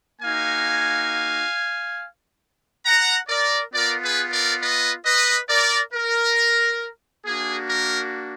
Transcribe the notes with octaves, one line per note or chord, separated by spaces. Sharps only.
A#3 D#4 F#4 F5 G#5
F#5 A#5
A#4 D5
B3 F4 A#4 D5
G#4 B4
A#4 D5
B4 D#5
B4 D#5
A#4 D5
A#4
A#3 D4 F#4 G#4
A#4